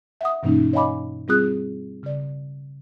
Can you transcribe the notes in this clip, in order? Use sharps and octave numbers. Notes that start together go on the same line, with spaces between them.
E5 F#5 D#6
G2 B2 E3 A#3 C#4 D#4
C#5 D#5 F5 G#5 B5 D6
G3 C4 F4 G#4 D#6 F#6
C#3 D5